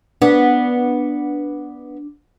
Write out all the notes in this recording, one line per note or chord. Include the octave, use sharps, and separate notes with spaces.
B3 D4